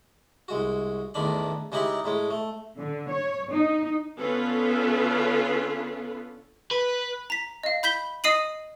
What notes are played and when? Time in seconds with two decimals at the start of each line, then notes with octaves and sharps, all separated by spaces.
0.48 C2 G#3 F#4
1.14 A1 E2 A2 D#3 D4 B5
1.72 C#3 G#3 D#4 E4 G4 B5
2.04 A2 G#3 C#4
2.30 A3
2.78 D3
3.10 C#5
3.52 D#4
4.18 D3 B3 C#4 F4 A4 B4
6.71 B4
7.30 A#5 B6
7.63 D#5 F5
7.83 B5 G6 B6 G7
8.24 D#5 D#6 C7 D#7 F#7